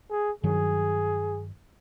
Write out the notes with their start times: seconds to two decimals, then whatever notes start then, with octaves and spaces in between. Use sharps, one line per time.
0.11 G#4
0.44 G2 D#3 F#3 G#4